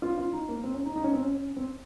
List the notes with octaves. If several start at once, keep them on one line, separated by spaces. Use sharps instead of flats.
F4
F4
D#4
A#3
C4
C#4
D#4
D#4
C#4
C4
C#4
C4